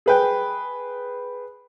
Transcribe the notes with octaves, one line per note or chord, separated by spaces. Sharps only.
G#4 B4 G5